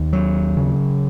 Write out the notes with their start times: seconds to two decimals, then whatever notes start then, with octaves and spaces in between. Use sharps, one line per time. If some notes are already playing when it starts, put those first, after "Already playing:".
Already playing: D#2
0.13 F#3
0.57 C#3